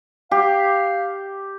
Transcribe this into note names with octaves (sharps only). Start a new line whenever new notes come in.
G4 F5